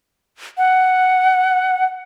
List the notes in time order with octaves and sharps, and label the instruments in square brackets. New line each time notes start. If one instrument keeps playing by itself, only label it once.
[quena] F#5